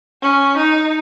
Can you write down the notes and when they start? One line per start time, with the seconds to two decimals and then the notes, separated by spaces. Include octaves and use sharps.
0.23 C#4
0.57 D#4